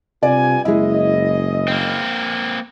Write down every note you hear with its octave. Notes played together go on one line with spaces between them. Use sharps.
G2 C3 F4 D5 G#5
F#1 G#3 E4 D#5
A#3 C4